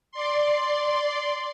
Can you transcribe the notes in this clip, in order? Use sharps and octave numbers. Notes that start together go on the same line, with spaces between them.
D5 C6